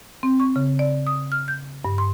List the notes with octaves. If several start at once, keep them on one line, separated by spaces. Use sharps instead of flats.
C4
C#6
C#3
D5
D#6
F6
G6
G2
C6